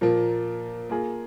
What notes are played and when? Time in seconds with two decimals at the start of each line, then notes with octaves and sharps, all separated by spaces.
0.01 A#2 F3 A#3
0.89 A#3 F4 G#4